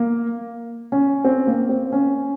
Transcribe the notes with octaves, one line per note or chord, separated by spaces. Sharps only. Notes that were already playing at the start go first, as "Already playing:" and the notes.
Already playing: A#3
C#4
C4
A#3
C4
C#4